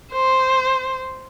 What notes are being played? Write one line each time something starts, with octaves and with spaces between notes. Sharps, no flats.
C5